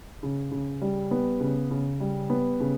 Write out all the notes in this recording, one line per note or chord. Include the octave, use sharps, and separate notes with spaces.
C#3
C#3
G3
B3
C#3
C#3
G3
B3
C#3